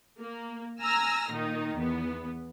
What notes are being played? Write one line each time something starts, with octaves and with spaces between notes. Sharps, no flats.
A#3
G#5 A#5 E6 F6 A#6
A#2 D#3 D#4
E2 B3